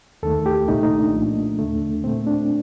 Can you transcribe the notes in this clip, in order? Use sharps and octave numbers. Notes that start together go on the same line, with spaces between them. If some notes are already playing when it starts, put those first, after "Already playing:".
D#2 D#3 A3 A4
G4
C2 A#2 A3 D#4
D#4
D4
A#2 F3 A3
D#2 D3 A3
A#2 A3 C4
D4